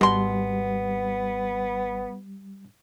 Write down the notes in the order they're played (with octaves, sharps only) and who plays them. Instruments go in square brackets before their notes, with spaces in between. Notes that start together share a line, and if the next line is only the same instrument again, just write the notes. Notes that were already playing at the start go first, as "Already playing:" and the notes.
[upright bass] G#1 [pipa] B2 C6 [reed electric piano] G3 [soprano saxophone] B3